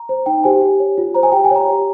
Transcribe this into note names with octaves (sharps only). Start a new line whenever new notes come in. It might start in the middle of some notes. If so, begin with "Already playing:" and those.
Already playing: A#5
C5
D#4 G5
G4 C5 G#5
G4
C#5
F4
C5 A#5
G#5
G4 G5
G#5
C#5 A#5
G4